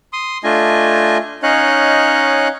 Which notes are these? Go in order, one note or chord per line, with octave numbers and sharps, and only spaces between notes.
C6 D#6
A3 D4 F4 D#5 G#5
C#4 D#4 C#5 D#5 F5 F#6